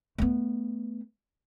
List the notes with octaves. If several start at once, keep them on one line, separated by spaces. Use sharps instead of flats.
A3 B3